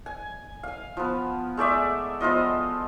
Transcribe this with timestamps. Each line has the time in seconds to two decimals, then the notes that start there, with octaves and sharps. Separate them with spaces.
0.06 G#5
0.63 F5 G#5
0.97 F3 B3
1.57 G#3 A3 D5 E5
2.21 F3 B3 F4 D#5